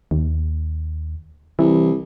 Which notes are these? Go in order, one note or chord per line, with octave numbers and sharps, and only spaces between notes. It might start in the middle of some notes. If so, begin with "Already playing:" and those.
D#2
C2 E3